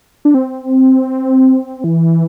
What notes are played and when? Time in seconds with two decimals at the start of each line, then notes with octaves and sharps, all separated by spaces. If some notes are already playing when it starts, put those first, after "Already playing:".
0.25 D4
0.34 C4
1.84 E3